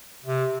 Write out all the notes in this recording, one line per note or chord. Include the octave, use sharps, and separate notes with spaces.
C3